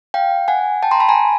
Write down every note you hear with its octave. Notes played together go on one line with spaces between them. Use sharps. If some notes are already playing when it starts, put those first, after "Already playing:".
F5 G5
F#5 G#5
G5 A5
A#5 C6
A5 B5
G#5 A#5